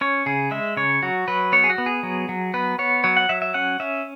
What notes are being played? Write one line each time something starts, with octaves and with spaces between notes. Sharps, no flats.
C#4 C#5
C#3 G#4
G#3 E5
C#3 C#5
F#3 F#4
F#3 B4
B3 C#5
G#4
F#4
B3
G#4
F#3
F#3
B3 B4
B3 C#5
F#3 C#5
F#5
F#3 E5
E5
C#4 F#5
C#4 E5